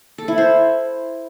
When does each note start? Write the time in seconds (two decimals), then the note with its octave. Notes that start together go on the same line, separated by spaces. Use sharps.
0.18 A4
0.28 E4
0.38 C5